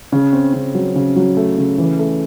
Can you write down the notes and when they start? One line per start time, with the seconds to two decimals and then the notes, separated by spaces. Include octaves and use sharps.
0.12 C#3
0.33 C4
0.54 C#3
0.74 F#3
0.95 C#3
1.16 F#3
1.37 A3
1.58 C#3
1.78 E3
1.99 A3